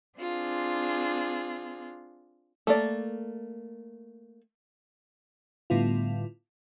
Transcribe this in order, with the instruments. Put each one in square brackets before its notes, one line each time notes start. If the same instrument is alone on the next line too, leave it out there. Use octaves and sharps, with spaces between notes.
[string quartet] C4 D4 F4 G#4
[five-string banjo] A3 A#3 D5
[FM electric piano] A2 D3 G3 B3 E4 F4